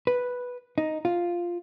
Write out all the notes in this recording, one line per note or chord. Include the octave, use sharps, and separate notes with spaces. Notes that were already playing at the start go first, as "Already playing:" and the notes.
B4
D#4
F4